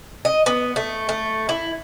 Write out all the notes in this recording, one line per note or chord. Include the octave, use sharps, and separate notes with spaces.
D#5
B3
A3
A3
E4